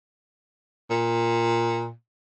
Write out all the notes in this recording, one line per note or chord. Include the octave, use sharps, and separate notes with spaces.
A#2